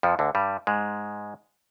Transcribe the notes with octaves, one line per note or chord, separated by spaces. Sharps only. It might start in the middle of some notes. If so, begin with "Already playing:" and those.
F2 F3
D2 D3
G2 G3
G#2 G#3